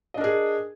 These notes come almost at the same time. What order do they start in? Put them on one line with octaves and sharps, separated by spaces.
D#5 D4 A#4 G#4